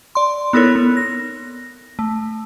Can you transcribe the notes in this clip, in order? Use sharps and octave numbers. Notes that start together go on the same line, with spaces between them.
D5 C6
B3 D#4 E4 A4 A#4 C#5
B3
A#6
A3